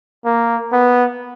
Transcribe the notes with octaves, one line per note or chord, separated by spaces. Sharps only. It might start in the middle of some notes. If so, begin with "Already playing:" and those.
A#3
B3